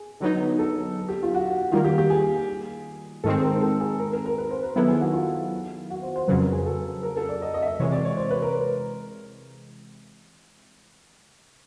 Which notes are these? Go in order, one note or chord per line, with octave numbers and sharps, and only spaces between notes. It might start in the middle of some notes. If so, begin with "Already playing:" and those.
Already playing: G#4
D3 F#3 B3 D#4
A4
G4
F4
F#4
D#3 G3 A#3 F4
G4
G4
G#4
G#2 D#3 G#3 C4 A4
A#4
A4
G#4
A#4
A#4
A#4
B4
C5
B4
D#3 F#3 B3 E4 A4
G#4
F#4
F4
F#4
C5
C5
F2 C#3 F#3 B4
A#4
G#4
A4
A#4
A4
D5
D#5
D#5
E5
D#5
C3 E3 G#3 C#5
D5
C#5
C5
B4
A#4